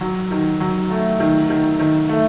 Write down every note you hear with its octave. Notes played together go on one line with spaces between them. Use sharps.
F#3
D#3
F#3
A3
D#3
D#3
D#3
A3